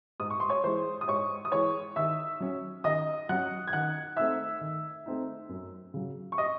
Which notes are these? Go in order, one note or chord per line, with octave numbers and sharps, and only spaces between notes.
G#2 D#6
C#6
C6
C#5 C#6
E3 G#3 C5 C6
D#6
G#2 C#5 C#6
D#6
E3 G#3 C#5 C#6
D#3 E5 E6
F#3 C#4
D#3 D#5 D#6
F#3 C#4 F#5 F#6
G#6
D#3 F#5 F#6
A3 C4 D#4 E5 E6
D#3
A3 C4 D#4
F#2
C#3 F#3
C#6
D#5 D#6